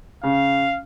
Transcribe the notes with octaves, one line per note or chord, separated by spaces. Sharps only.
C#3 F5